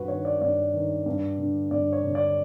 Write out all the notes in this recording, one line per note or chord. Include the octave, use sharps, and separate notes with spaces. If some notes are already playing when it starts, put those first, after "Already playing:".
Already playing: G2 F#4 B4
D#3 C#5
D5
G2 D5
D#3
G2
D3
G2 D5
C#5
D3
D5